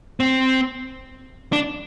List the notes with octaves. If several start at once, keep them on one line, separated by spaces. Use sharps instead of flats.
C4
D4